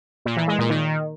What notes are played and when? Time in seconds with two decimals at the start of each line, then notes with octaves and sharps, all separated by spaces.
0.25 A#2
0.37 E3
0.48 G#3
0.59 A#2
0.70 D#3